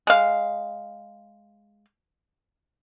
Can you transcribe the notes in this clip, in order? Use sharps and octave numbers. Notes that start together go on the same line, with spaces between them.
G#3 F5